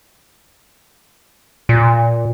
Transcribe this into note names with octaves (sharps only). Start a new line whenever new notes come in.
A#2